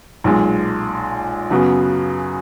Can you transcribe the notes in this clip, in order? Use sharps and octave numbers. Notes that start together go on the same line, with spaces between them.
B1 A#2 G#3
F#2 C#3 F#3 B3 F#4